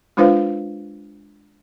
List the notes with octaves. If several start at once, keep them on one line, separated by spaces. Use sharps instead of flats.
G#3 D4 F4 B4 C5 F5